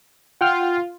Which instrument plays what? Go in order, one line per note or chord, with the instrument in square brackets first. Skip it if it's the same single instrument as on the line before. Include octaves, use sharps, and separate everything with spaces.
[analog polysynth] F4 [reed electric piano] F#5 G5 F6